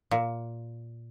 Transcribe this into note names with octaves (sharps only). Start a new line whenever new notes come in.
A#2